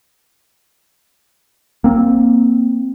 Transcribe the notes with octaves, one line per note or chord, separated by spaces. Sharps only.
A#3 C4